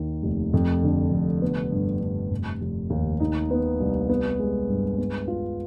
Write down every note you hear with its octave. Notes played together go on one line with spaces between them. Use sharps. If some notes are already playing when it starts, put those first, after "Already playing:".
Already playing: D#2 D#3
F1
F2
D3
F1
B3
G2
G2
F1
F1
D#2
D#4
B3
C2
B3
G#3
G2
B3
F4